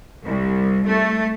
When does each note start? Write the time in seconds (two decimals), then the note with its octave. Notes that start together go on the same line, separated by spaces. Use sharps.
0.24 C2
0.86 A3